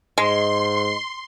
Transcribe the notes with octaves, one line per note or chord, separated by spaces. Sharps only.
G#2 G#3 C6